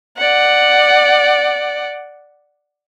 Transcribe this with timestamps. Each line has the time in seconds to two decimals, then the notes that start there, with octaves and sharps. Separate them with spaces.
0.18 D5 F#5